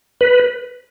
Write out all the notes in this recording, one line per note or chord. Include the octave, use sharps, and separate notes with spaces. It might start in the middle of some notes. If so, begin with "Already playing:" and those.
B4